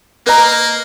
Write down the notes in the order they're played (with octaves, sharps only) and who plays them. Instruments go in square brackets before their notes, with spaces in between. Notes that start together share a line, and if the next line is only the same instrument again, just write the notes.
[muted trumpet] A#3 [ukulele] B4 D#5 A#5